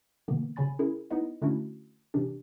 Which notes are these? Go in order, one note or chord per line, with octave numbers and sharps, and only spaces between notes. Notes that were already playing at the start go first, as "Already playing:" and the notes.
B2 D3 E3 A#3 B3
C#3 C#5 G#5 B5 A6
C#4 E4 G#4 A#4
B3 D#4 E4 B4 D#5 F#5
D3 A3 C#4 D4 E4 F#4
C3 E3 C#4 D4 G4